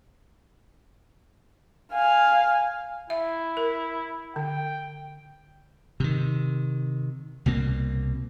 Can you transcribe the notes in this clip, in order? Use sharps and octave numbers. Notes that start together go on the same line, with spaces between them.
F5 G#5
E4 E5
A#4
D3 G5
C3 D#3
C2 B2 A#3 C4